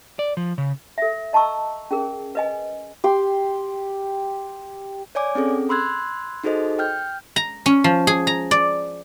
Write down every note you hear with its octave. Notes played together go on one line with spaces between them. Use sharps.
D5
F3
C#3
A4 E5
D#5 A5 A#5 C#6 E6
C#4 G#4 A#4
B4 D#5 G#5
G4 C6
C#5 D5 G#5 D6
C4 C#4 G#4 A4
B5 C6 E6 F#6 G#6
D#4 F#4 G#4 A4 C5 D#5
G5 F6 G6
A#5
C#4
F3
G#4
A#5
D5